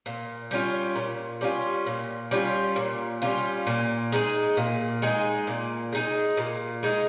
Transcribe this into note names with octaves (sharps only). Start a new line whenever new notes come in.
A#2
G3 C#4 F4
A#2
G3 C#4 F4
A#2
G3 C#4 F4
A#2
G3 C#4 F4
A#2
G#3 D#4 G#4
A#2
G#3 D#4 G#4
A#2
G#3 D#4 G#4
A#2
G#3 D#4 G#4